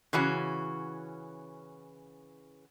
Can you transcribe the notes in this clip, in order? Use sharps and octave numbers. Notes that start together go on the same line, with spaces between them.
C#3 E3 C#4 F#4